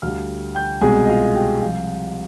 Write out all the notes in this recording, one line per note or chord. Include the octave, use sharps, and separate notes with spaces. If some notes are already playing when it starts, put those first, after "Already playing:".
D2 D3 G3 F5 F6
G5 G6
C2 B2 G#3 G#4 G#5
D#5
F4 F5
G4 G5
C2 C3 F3 F4 F5